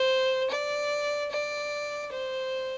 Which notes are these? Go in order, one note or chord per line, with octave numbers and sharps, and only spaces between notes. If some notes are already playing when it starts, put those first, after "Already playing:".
Already playing: C5
D5
D5
C5